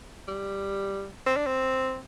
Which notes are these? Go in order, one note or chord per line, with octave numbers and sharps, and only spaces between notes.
G3
C4
D4
C4